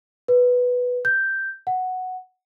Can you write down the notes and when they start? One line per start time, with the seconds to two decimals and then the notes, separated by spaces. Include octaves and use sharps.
0.28 B4
1.05 G6
1.67 F#5